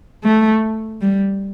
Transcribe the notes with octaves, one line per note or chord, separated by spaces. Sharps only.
A3
G3